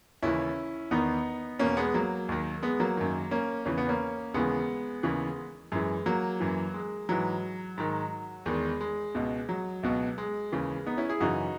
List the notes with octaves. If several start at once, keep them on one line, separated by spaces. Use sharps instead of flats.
D#2 C#3 E3 C#4 E4
E2 D#3 B3 D#4
E2 B2 A#3 C#4
G#3 B3
F#3 A#3
D#2 D#3
G#3 B3
F#3 A#3
F#2 D#3
A#3 C#4
E2 C#3 E3 C#4
B3
A#3 C#4
D#2 C#3 E3 G#3 B3
D#2 C#3 E3
F#2 E3 G#3
F#3 A#3
F#2 E3
G#3
G#2 E3 F#3
G#2 D#3
E2 D#3 G#3
G#3
C#2 B2
F#3
C#2 B2
G#3
D#2 C#3 E3
B3 D#4
C#4 E4
E4 G#4
F#2 C#3 E3 D#4 F#4